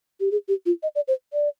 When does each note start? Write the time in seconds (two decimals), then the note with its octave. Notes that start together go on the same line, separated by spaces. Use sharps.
0.20 G4
0.31 G#4
0.48 G4
0.66 F4
0.83 D#5
0.95 D5
1.08 C5
1.33 D5